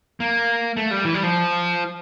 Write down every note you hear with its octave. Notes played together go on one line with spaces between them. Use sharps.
A#3
A3
G3
E3
G3
F3